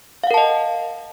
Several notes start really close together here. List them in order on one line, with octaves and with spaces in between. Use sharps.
F5 F#5 A#4 A5 D#5